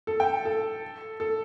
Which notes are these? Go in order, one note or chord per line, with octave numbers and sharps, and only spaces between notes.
A4
G5
A4
A4